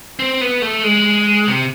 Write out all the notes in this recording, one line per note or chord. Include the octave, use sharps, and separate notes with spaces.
C4
B3
A3
G#3
C3